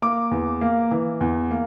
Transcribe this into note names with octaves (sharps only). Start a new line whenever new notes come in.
A#3 D6
E2
A#3
E3
E2
A#3